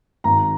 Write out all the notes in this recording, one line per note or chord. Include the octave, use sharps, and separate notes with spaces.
G#1 A#5